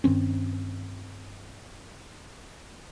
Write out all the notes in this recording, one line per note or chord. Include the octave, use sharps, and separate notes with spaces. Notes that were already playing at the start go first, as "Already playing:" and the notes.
G2 D#3 C4 C#4